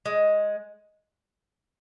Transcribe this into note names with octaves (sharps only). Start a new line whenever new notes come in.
G#3